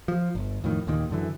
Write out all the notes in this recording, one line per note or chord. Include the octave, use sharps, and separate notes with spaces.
F3
G1
F2 A2 D#3
D#2 A#2 D#3
F#2 D3 E3